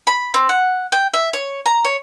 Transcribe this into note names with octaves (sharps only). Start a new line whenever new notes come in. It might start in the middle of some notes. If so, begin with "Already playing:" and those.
B5
C4
F#5
G5
E5
C#5
A#5
C#5